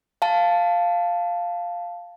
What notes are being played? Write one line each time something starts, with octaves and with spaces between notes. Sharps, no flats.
F5 A5